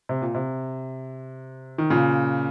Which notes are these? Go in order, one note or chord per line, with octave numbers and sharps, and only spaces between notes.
C3
A#2
C3
D#3
A#2 C#3